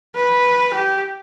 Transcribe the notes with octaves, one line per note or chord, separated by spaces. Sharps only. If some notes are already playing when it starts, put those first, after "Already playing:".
B4
G4